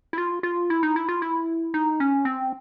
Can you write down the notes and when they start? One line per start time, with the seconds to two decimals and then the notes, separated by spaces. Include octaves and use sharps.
0.13 E4
0.18 F4
0.43 F4
0.70 E4
0.83 D#4
0.96 E4
1.09 F4
1.22 E4
1.74 D#4
2.00 C#4
2.25 C4